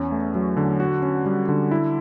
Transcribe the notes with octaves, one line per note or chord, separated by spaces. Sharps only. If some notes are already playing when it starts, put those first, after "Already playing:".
Already playing: E2 C#4
A3
F#3
D3
F#4
C#4
G3
D3
E4